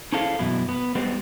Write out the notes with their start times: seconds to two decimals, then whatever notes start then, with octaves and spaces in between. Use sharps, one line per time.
0.12 C#4 E4 G#4 A4 C5 F5
0.39 F#2 B2 E3 E4
0.69 B3
0.95 G3 G#3 B3 C4